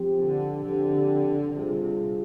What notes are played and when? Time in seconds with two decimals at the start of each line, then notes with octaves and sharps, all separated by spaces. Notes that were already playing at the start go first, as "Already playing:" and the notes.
Already playing: F3 C4 G4
0.20 D3
0.65 D3 F3 C4 G4
1.55 C3 G3 D4 F4 G#4